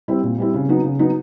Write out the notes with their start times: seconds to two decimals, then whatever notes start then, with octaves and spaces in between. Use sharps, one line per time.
0.08 G3 C4 E4
0.23 A#2
0.38 G3 C4 E4
0.54 C#3
0.68 F#3 B3 D#4
0.84 C#3
0.99 F#3 B3 D#4